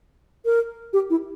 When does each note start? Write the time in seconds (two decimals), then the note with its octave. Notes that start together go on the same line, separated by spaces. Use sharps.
0.45 A#4
0.93 G4
1.10 E4